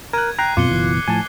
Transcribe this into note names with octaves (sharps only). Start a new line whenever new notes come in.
A#4 F#6 G#6 D#7
G5 A#5 F#6 C7
F#2 B2 C4 F4 D6 C#7 G7
F#1 B2 E3
A2 F3 G#5 A5